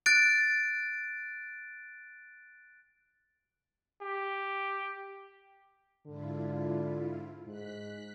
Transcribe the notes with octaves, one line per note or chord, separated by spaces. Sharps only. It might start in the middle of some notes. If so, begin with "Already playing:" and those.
F#6 A6 D7
G4
G#2 D3 E4 F4
G#2 F#6 B6